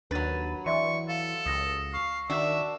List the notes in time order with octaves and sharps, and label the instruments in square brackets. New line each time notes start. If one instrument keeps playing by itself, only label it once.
[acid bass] D#2 [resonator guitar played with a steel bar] F#3 B4 [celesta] D4 A6 D#7
[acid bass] E3 [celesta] D5 E5 C6 [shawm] C#6
[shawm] A4 [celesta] F5
[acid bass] C#2 [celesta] D#6 A#6
[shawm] F5 [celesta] C#6
[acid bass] D#3 [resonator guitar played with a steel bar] D4 F#4 [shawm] E5